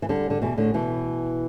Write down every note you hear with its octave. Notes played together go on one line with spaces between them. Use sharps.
E3
D3 G3
D3
B2 E3
A2 D3
B2 E3